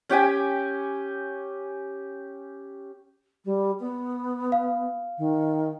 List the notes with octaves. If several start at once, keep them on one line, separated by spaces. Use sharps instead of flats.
C#4 G4 G5 G#5
G3
B3
F5
D#3